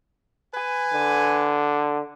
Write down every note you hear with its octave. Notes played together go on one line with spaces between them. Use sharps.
B4 G#5
D3